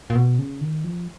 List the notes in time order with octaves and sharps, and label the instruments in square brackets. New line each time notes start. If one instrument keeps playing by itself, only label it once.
[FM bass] A#2
B2
C#3
D#3
F3